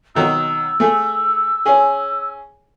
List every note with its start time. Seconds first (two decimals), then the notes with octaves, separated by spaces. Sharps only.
0.15 B2 D#3 F#3 E6
0.80 A3 G#4
1.66 C#4 G#4